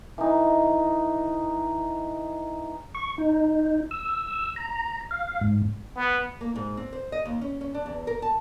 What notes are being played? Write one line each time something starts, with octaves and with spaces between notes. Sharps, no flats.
E3 D#4
C#6
D#4
E6
A#5
F5
G#2
B3
A#3
G#2
C4
C5
D#5
D#2
C#4
C#4
D4
E2
A#4
A5